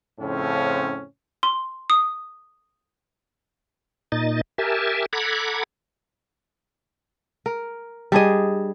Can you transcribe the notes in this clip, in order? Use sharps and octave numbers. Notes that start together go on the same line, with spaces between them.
F2 A2 C#3 F3 C4 C#4
C6
D#6
A#2 D#4 D#5 A6
G4 A#4 E5 G#5 A5
A4 F#5 A#5 B5 D6 G#6
A#4
G3 D4 G#4 D#5